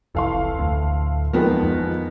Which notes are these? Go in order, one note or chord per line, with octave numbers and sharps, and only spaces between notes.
F1 C2 E3 A4 F5 C6
D2 A2
E2 D#3 F3 G#3 B3 A#4
F2